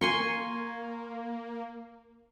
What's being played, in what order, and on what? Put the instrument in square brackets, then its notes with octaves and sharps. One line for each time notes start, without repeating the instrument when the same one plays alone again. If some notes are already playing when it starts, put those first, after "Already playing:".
[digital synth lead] A#3 [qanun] G#5 C6 C#6